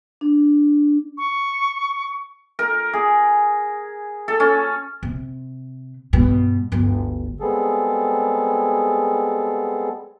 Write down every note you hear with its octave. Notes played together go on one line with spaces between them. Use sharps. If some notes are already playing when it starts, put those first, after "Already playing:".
D4
C#6
A#4
G#4
A4
C#4
C3
G2 B2
G1 D2
G3 G#3 B3 C4 G#4 A4